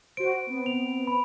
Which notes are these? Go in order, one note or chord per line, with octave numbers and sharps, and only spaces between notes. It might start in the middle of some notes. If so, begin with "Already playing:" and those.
F#4 C5 D7
B3 C4
F7
B5